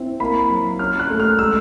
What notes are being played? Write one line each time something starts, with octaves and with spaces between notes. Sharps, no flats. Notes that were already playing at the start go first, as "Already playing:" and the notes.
Already playing: C4 E4
A#3 B5
F#3
C#4 F6
F#6
A3
F6
G#3 E6